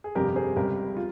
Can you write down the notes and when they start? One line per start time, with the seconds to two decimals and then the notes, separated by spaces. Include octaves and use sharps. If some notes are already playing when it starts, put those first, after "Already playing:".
0.04 G#4
0.15 G1 F2 C3 G3 G4 A#4
0.36 G#4 C5
0.56 C#2 C3 G3 G4 A#4
0.97 F4